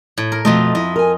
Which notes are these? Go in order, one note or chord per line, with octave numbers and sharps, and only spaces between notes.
A2
A#4
F2 B2 A3 F4 D#5
E4 D#5
A#4 G#5